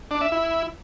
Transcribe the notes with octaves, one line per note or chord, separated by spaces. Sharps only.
D4
E5
E4